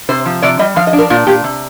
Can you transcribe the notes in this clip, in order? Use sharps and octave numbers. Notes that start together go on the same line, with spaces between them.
C3 C5
F3
C3 D5
G3 D#5
F3 F5
D#5
D4
A#4
A#2 F4
A#2 G4
C3